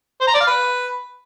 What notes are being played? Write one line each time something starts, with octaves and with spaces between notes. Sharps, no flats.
C5
A#5
D5
F5
B4